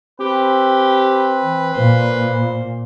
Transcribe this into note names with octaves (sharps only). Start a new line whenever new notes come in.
C4 G4 B4
E3
A#2 C5